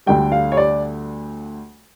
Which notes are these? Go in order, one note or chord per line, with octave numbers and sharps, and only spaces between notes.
D2 D3 G3 G5
F5
C#5
D5